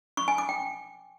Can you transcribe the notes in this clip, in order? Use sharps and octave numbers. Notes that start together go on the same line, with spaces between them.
C#6
G#5
D6
G5